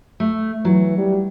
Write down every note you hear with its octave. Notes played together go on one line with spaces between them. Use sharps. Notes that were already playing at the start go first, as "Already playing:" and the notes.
A3
E3 F#3
G3